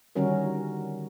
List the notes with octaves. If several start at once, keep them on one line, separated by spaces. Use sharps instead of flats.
D3 D#3 G3 C#4 F#4 A#4